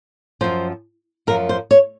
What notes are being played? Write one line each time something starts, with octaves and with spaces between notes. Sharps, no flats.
F#2 F3 C5
F#2 F3 A#4
C5
C#5